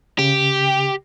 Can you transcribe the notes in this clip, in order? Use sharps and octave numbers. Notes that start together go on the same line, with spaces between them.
C#3 G4